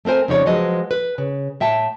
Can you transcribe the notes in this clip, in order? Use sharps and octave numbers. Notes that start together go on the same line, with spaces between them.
A3 C4 A#4 C5 G#5
F2 C#3 D#4 G4 C#5 D5
F3 F#3 G#3 B4 D#5
B4
C#3
A2 E5 G5 A5